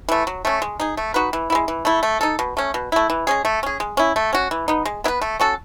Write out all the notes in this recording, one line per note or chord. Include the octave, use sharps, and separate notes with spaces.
E3 A3
F#3
A3 C#4
G#3
D#4 G#4
A3
D#4 F#4 B4
E3
B3 E4
G#3
E3
A3 E4
A3
D#4 A4
B2
A3 C#4
B2
A3 E4
E3
G#3 C#4 G#4
A3
C#4 G#4
G#3
C#4 E4
A3
C#4 F#4
E3
B3 D#4
G#3
B3 E4 B4
A3
C#4 F#4 A4